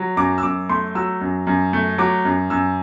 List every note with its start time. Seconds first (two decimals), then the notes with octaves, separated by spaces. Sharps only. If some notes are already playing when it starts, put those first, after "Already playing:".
Already playing: F#3
0.17 F#2 D6
0.38 E6
0.43 F#2 D6
0.69 A3 C6
0.95 F#3 E6
1.21 F#2
1.47 F#2
1.73 A3
1.98 F#3 D6
2.25 F#2
2.50 F#2 E6